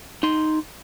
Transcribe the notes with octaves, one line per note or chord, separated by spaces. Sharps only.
D#4 C6